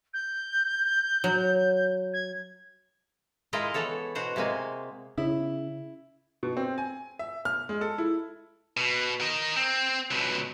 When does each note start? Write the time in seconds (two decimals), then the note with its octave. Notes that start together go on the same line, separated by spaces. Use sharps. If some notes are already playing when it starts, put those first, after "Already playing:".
0.14 G6
1.24 F#3
2.13 G#6
3.53 G#3 E4 F4 A#4 D#5
3.74 E3 B3 A4 C#5
4.15 B2 F#4 C5 A#5
4.36 C3 G#3 A#3 G#5
5.18 C#3 E4
6.43 B2
6.57 C4
6.78 G#5
7.19 E5
7.45 F6
7.69 G#3
7.81 A4
7.98 E4
8.77 B2
9.21 A#4 D#5
9.57 C4
10.11 C#2 B2